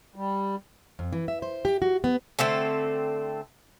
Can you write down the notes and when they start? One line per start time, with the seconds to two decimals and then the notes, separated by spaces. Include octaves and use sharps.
0.16 G3
0.99 F2
1.13 E3
1.28 E5
1.42 C5
1.65 G4
1.82 F#4
2.04 B3
2.39 D3 A3 C4 A4